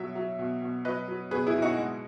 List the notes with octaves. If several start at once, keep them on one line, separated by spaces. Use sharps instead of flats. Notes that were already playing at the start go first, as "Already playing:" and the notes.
Already playing: B2 F#3 E5
F#3
B2
B2
F#3 B4 D#5
F#3
B2 G#4 B4
E4 G#4
B2
D#4 F#4
G#3